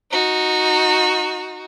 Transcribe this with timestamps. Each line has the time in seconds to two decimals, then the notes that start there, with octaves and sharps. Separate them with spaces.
0.11 D#4 F#4